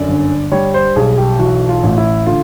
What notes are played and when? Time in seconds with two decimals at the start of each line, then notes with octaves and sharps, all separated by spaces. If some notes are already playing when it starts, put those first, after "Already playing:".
Already playing: F#2 D3 D5
0.09 G1
0.52 G3 C#5
0.74 C5
0.96 B1 G#4
1.18 G4
1.39 E3 F#4
1.69 F4
1.83 A1
1.98 E4
2.26 D3 F4